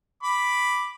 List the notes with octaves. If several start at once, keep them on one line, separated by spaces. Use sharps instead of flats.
B5 D6